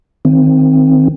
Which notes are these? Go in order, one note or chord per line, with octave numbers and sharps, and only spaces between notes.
D#3 C4